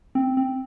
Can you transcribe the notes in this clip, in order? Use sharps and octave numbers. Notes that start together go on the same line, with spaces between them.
C4
C4